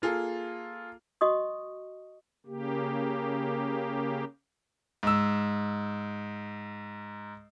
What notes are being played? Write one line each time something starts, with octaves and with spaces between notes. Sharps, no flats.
A#3 F4 G#4 A4
F#4 D#5 C#6 D#6
C#3 A#3 G4
G#2 E6